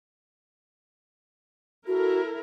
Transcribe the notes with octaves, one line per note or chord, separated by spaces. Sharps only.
E4 F#4 A4 A#4